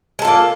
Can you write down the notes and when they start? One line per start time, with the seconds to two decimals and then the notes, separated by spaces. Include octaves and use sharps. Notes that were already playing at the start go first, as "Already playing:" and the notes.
0.19 G#3
0.22 A4
0.25 F4
0.27 A#3